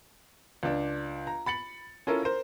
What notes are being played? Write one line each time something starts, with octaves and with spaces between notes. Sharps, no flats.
C#2 D4
A#5
B5 A6 C#7 F#7
C#4 E4 F4 A4 A#4 F5
A#4 C5